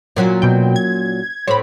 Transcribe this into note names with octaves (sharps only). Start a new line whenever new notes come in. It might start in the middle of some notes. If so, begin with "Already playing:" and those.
A#2 F#3 C#4
B2 G5
G#6
A2 C4 C#5 B5